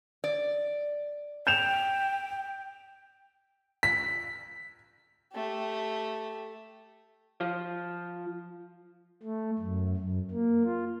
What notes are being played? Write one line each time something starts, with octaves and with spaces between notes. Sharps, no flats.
D5
G5 G6 E7 F7
B6
A3 G4
F3
A3
F#2
F#2
A#3
F4